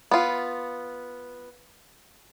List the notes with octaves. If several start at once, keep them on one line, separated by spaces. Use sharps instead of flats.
B3 F4